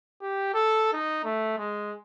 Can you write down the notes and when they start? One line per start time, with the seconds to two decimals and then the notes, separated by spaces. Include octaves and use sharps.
0.21 G4
0.54 A4
0.93 D#4
1.25 A3
1.58 G#3